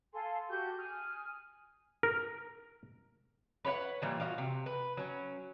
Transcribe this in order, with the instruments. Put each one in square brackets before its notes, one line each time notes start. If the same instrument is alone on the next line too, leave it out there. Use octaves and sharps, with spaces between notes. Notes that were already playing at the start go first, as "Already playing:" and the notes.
[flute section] A4 F5 G#5 C6
F#4 G4 A4 G6
G#5 D#6 F6
[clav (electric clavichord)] A#4
[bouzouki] B4 C#5 E5 F#5
A#2 E3 G3
F4 F#4 D5 F5
C3
B4
F#3 C#4